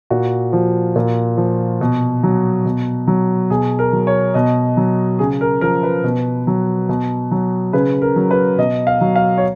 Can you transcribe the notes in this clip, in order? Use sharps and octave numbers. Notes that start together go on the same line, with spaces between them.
A#2 F#4
F3
A#2
F3
B2
F#3
B2
F#3
B2 G#4
A#4
F#3
C#5
B2 D#5
F#3
C#3 G#4
A#4
F3 A#4
B4
B2
F#3
B2
F#3
C#3 B4
A#4
F#3
B4
B2 D#5
F5
F#3
F5
C#5